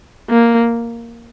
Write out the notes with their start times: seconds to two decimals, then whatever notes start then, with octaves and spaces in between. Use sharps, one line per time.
0.29 A#3